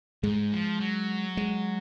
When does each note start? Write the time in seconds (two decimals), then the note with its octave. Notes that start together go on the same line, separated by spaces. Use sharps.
0.23 G#2 G#3
0.52 F3
0.80 F#3
1.37 G#3